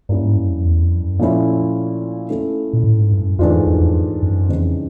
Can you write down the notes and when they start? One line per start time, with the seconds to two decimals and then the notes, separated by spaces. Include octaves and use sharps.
0.09 G2 G3 A#3 C#4 E4
0.22 G#2
0.36 F#2
0.50 F2
0.65 E2
0.83 F2
1.01 F#2
1.19 A#2 F3 A3 C#4 E4
2.30 A3 C#4 E4 A4
2.73 A#2
2.84 A2
2.98 G#2
3.12 G2
3.26 F#2
3.39 F2 G#2 E3 A3 D4 F4
3.67 F2
3.81 F2
4.22 F#2
4.49 F2 C#3 E3 G3 C4 D#4